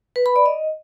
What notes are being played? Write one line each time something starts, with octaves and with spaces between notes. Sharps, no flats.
B4
B5
D5
D#5